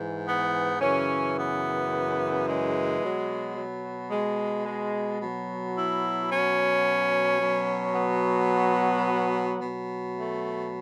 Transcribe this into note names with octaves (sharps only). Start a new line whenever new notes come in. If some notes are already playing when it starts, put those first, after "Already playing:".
Already playing: G#2 E3
B3
F#2 C#3 E3 C#4
B3
G#3
B2 F#3
F#3
G#3
G#3
B2 F#3
E4
C#4
B2 F#3
B3
B2 F#3
A3